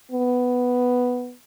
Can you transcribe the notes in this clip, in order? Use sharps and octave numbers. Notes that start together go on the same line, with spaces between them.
B3